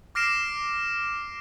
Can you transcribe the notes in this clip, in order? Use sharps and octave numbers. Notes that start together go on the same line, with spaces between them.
D6 F6 A#6 C7 D7 E7